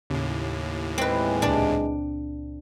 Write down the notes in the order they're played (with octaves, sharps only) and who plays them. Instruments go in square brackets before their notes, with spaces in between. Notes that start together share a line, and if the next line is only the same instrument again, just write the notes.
[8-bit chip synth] D#2 A2 [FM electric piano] C#3
[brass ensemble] B1 E3 G#3 [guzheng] C4 B4
[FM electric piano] C#2 A#2 [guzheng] D4 D5